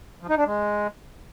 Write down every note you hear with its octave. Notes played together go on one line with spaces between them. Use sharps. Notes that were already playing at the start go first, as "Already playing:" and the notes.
F3
D#4
D4
G#3